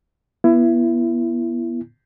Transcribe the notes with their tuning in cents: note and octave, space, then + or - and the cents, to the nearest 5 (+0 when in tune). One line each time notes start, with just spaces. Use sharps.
B3 -25 E4 +25